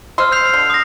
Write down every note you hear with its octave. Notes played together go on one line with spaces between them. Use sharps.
C5 D#5 C6 E6 F6
G6 C7 F7
D3 C7
D#6 A#6